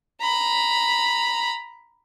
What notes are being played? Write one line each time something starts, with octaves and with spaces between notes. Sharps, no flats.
A#5 B5